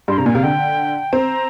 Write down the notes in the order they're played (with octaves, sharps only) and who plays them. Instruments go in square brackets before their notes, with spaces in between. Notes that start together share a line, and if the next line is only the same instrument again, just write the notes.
[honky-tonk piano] G2 [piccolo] C6
[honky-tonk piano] C3 [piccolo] A#5
[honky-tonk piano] A#2 [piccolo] G#5
[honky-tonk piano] C3 [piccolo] F5
[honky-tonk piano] D3 [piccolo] G5
[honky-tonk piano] C4 [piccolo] A#5